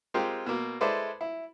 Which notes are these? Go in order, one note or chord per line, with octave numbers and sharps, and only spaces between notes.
G#3 C4 F4 G4 A#4
B2 A#3
G#3 E4 A4 B4 C5 D5
E4